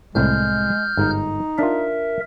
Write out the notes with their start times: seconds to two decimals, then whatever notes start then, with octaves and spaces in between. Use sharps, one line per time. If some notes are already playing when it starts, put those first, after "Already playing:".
0.15 C2 A2 G#3 F6 G6
0.97 G1 G#2 D#4
1.59 D4 F4 A#4 E5